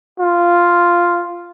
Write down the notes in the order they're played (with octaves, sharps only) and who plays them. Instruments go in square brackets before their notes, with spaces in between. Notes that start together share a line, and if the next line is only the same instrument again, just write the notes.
[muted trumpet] F4